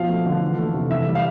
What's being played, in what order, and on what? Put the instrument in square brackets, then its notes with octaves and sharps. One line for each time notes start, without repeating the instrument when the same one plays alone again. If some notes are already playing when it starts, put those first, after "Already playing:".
Already playing: [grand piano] B2 F3 F5
A3
D3
E3
A3
C3
E3 E5
G3
F5